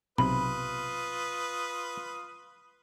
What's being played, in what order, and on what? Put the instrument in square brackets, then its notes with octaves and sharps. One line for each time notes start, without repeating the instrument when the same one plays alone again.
[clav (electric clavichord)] B1 C3 A#5 [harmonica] F4 B4 D#6 [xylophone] B5